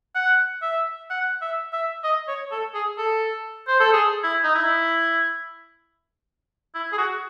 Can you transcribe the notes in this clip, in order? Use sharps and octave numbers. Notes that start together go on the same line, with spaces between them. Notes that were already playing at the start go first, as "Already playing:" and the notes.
F#5
E5
F#5
E5
E5
D#5
C#5
A4
G#4
A4
C5
A4
G#4
E4
D#4
E4
E4
G#4
F#4